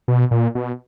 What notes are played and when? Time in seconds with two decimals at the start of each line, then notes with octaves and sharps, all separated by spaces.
0.08 B2
0.31 A#2
0.55 B2